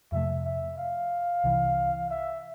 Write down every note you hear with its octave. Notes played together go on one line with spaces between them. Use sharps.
F2 C3 F3 A3 E5
E5
F5
C2 C3 E3
E5